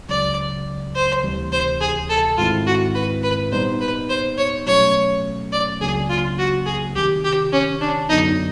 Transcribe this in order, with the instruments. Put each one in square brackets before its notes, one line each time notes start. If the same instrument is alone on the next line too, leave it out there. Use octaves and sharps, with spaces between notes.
[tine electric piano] C#2 C#3 F#3 [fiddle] D5
[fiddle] C5
[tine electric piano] D2 C3 E3 G3
[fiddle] C5
G#4
A4
[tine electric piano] G#2 D#3 G#3 C4 E4 [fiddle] F4
[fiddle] F#4
B4
B4
[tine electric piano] A#2 G3 B3 D#4 [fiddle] C5
[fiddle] B4
C5
C#5
[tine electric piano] B2 F#3 A3 C#4 [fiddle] C#5
[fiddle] D5
[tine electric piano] C#2 C#3 F#3 A#3 D4 [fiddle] G#4
[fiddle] F4
F#4
G#4
[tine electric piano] C2 C3 D#3 [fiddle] G4
[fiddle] G4
C#4
D4
[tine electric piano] F#2 D3 F#3 B3 [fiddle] D#4